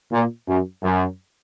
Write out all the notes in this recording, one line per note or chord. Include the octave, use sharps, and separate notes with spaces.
A#2
F#2
F#2